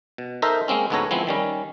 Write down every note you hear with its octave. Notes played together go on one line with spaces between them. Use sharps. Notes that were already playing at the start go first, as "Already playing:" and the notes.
B2
D#4 A4 A#4 C5 D#5 E5
G#3 A#3 C4 C#4
D2 G#2 B3 A4 C#5 A#5
F3 G#3 B3 C4 E4
D#3 G3 C#4